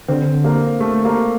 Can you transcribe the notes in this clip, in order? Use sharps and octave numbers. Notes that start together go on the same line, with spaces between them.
D3 C4
A#3
A3
A#3